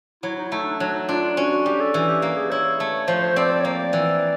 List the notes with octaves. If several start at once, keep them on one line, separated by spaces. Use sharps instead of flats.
F#3 E4
D#4
E4
A3 D#4
D4
F#3 D4
D#4
D4 F4
F4
C#4 F#4
F#4
G3 G4
A4
E3
G4
A#3
G#4
E4 C#5
A3
F3 C5
C4 D5
C#5
A#3 D5
E3